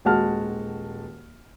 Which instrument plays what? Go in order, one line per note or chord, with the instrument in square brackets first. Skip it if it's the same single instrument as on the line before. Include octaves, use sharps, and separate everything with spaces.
[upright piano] D#1 G#3 F#4 A5 F6